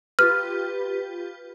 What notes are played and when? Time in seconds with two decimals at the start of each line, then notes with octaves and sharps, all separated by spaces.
0.19 F4 G4 B4 F6